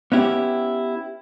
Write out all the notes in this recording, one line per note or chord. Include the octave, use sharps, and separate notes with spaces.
B3 C#4 E4 G4